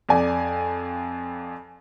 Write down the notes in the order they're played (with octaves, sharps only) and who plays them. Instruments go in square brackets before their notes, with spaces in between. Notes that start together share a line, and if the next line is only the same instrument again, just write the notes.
[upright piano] F2 D5 G#5